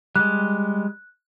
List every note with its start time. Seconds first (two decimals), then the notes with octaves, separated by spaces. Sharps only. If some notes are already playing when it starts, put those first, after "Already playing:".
0.16 G3 G#3 F#6